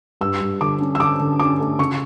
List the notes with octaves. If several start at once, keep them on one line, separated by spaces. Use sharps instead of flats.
G2 E6
G2
D3 D6
C#4
E6
D3 D6
D3
C#4 D6
A3
C#3 C#6